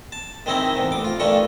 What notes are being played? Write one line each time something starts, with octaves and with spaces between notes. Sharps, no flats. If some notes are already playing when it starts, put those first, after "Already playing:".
A5
D#3 G#3 C4 D#4 E4
E2 G#2 C3
A1 D6
F4
G2 D#3 G#3 A3 D4 C#6